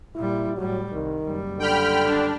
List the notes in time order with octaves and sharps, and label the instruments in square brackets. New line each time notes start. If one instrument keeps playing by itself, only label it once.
[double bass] A#2 G3 [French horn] E4
[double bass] A2 G3 [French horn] F#3
[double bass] C2 [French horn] D#3
[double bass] F#1 G3
[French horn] D3 [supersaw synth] G5 B5 F6
[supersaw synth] D4